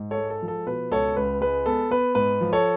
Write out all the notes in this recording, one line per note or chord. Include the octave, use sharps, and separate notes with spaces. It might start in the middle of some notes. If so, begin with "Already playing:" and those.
Already playing: G#2
A4 C#5
G#3
A4
F3
A4
B2 B4
C#2 A4 C#5
C#2 B4
G#3 B4
B3 A4
B3 B4
G#2 B4
F3
A4 C#5